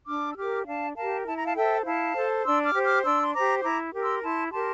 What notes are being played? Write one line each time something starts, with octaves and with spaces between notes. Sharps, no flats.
D4 D6 F6
E6
G4 A#4 D6 F6
D4 F5 A5
G4 A#4 F5 A5
E4 A5
A#5
F5 A5
A4 C5 E5 G5
E4 F5 A5
A4 C5
D4 C6 E6
D6 F6
G4 C5
D6 F6
D4 C6 E6
C6
G4 C5 A#5 D6
E4 A#5 D6
G4 A#4
C6 E6
E4 A5 C6
G4 A#4 A5 C6